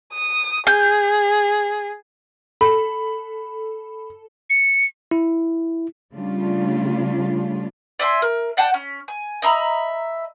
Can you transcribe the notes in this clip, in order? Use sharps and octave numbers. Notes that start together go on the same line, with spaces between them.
D#6
G#4 G6
A4 B5
C#7
E4
C#3 G3 A3 D4 F4
D5 E5 G#5 C6
A#4
D5 F#5 G5 A5
C#4
G#5
D#5 E5 A#5 B5